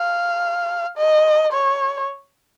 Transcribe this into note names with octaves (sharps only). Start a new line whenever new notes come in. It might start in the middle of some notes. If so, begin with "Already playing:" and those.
Already playing: F5
D#5
C#5